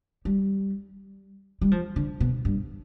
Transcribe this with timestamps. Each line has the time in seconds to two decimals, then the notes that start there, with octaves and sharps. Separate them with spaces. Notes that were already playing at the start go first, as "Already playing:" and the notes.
0.25 G3
1.61 G3
1.71 F3
1.96 D3
2.20 B2
2.45 G2